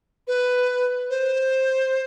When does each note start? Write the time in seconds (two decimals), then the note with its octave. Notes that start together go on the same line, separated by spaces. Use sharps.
0.27 B4
1.10 C5